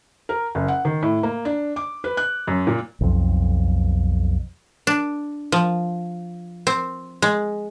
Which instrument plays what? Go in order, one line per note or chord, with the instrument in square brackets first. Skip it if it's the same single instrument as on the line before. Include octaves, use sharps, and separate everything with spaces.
[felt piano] A#4
F#1
F#5
D#3
A2
A#3
D4
D6
B4
F#6
F#2
A#2
[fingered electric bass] B1 F2
[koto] D4
F3
C4
G#3